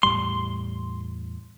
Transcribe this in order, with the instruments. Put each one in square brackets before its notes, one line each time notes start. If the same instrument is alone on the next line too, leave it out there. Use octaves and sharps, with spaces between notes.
[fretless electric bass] E2 A2 G3 [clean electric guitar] C6